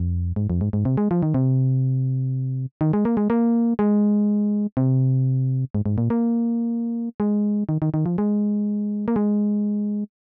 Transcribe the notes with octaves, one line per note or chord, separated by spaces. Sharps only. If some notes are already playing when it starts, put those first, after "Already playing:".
Already playing: F2
G#2
F2
G#2
G#2
C3
G#3
F3
D#3
C3
D#3
G#3
A#3
G#3
A#3
G#3
C3
G#2
G#2
A#2
A#3
G#3
D#3
D#3
D#3
F3
G#3
A#3
G#3